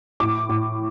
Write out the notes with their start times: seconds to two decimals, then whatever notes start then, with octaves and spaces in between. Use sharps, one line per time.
0.20 A2 D6
0.49 A2